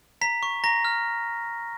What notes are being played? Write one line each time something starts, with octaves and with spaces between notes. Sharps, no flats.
A#5 B6
C#6
A#5 A#6
F6